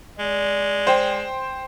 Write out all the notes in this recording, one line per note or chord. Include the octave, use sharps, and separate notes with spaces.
G#3 D5
C5 G5